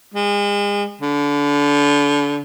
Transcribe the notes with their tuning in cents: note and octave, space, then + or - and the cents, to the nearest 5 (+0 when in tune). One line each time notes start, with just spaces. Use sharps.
G#3 -35
D3 -30